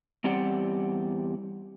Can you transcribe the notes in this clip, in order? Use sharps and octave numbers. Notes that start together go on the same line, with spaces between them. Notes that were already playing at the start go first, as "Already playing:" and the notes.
E2 G3 C4 G4 D5 F#5